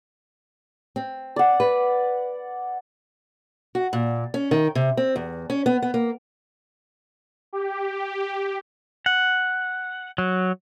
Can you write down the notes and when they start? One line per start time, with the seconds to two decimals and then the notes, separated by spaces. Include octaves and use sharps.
0.96 C4
1.36 D5 F#5
1.60 B4
3.75 F#4
3.93 A#2
4.34 C#4
4.51 D#3
4.75 C3
4.97 C4
5.16 E2
5.50 C#4
5.66 B3
5.82 B3
5.94 A#3
7.53 G4
9.06 F#5
10.18 F#3